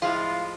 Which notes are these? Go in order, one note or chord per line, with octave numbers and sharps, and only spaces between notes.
A2 F3 G#3 C4 E4 F4